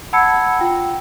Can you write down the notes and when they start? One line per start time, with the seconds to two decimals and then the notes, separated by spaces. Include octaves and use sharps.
0.13 F#5 A5 B5 E6 G#6 C#7
0.59 F4 G5